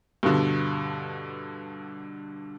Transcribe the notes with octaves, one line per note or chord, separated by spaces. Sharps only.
G2 B2 D3